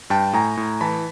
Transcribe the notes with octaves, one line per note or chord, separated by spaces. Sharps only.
G2 G5 A5
A2 G#5 A#5
A2
E3 A5 B5